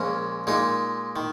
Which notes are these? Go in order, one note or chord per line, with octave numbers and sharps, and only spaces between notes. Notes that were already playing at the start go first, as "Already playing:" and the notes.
Already playing: A#1 A#2 G#3 C#4
A#2 G#3 D#4
D#3